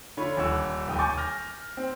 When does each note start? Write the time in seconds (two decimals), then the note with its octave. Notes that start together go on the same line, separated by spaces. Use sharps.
0.17 D3 F4 C#5 B5
0.37 D#1 C#5 F#5 E6
0.87 D#1 D#2 G5 D#6
0.99 G#5 C#6 D6 G6 A6
1.17 F6 G6 A#6
1.77 C4